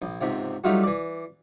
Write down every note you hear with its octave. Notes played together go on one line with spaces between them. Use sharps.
A#1
C#2 G#2 C3
F#3 G3 A3 D#4 F4 F#4
E3 D5